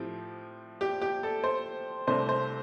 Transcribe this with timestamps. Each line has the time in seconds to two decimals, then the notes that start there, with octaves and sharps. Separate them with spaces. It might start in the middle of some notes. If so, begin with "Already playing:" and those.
Already playing: A2 F3 C4 G4
0.81 G4
1.01 G4
1.23 A4
1.44 C5
2.07 C2 C3 A3 D4 C5
2.29 C5